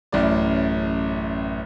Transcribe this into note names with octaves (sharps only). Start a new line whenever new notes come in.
A1 F#2 A2 D5